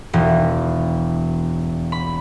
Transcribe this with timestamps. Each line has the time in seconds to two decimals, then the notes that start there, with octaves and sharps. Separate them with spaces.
0.13 E1
1.92 B5